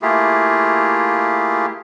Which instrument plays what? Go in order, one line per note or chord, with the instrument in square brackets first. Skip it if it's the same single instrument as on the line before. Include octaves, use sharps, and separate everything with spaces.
[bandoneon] A3 A#3 E4 F4 G4 G#4